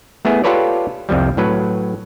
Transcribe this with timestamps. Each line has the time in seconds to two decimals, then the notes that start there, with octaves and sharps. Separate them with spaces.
0.25 A3 B3 E4 G#4
0.44 F4 G4 A4 B4 C#5 D5
1.09 C2 F2 F3 G3
1.37 A2 F#3 B4